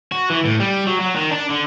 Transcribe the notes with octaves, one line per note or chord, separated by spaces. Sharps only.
F#4
E3
A2
G3
F#3
F#3
D#3
D4
D3